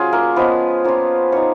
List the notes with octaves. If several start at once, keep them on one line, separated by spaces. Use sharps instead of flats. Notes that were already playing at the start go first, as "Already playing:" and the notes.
Already playing: F#3 C#4 F4 G#4
A#3 A#4
F3 G#3 B3 C#4 B4
F3 A#3 C#4 F4
A#3 C#4 D#4 C#5